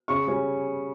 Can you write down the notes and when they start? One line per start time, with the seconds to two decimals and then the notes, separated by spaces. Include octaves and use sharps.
0.08 C#3 C#6
0.27 G3 C#4